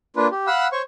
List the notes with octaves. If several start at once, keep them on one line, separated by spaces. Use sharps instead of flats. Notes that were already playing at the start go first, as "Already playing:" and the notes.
A#3 D4 F4 B4
G4
F5 F#5 B5 E6 F#6
C5 C#5 C#6